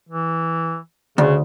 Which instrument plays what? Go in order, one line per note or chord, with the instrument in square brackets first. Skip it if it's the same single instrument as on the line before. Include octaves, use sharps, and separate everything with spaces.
[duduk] E3
[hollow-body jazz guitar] D2 [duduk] C#3